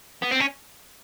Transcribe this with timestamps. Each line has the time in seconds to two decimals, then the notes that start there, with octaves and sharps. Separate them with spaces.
0.23 B3
0.32 C4
0.41 C#4